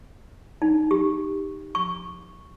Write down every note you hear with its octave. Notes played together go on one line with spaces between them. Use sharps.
D#4
G4
C#6